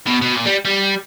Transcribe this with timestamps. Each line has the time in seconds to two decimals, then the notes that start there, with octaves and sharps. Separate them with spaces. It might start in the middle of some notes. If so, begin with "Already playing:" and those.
0.07 B2
0.22 B2
0.36 A#2
0.45 G3
0.65 G3